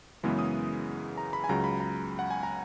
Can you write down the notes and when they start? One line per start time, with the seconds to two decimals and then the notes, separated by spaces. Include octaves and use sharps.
0.23 F#2 C#3 E3 G#3 B3
0.39 D#6
1.18 A#5
1.33 B5
1.44 G#5
1.49 C#2 C#3 F#3 A#5
1.64 B5
1.80 A#5
2.19 F#5
2.30 G#5
2.43 A#5